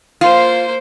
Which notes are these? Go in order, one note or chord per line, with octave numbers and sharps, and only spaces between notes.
A#3 F4 C5